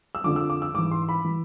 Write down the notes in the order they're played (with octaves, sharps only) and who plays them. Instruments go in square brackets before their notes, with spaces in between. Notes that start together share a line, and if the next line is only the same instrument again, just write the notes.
[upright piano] E6
F2 D3 F3 D6
E6
D6
E6
G#2 D6
E3
C6
B5
E3